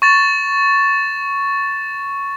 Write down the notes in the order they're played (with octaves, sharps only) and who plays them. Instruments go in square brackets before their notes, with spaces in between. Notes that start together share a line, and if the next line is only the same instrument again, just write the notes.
[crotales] C#6 A6 E7